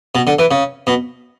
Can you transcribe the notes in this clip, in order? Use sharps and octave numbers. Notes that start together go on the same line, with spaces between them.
B2
D3
E3
C#3
B2